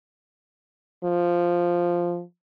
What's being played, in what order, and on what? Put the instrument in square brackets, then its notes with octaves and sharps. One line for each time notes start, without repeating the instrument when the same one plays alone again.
[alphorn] F3